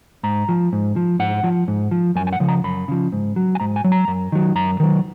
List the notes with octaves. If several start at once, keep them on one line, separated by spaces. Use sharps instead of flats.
G#2 A#5
F3
G#2
F3
G#2 F#5
F3
G#2
F3
F#2 G#5
G#5
F#5
C#3 F3
A#5
F#2 B5
C#3 F3
G#2
F#3
G#5
G#2 A#5
G#5
F#3
A#5
F#2
D#3 F#3
F#2 A#5
D#3 F#3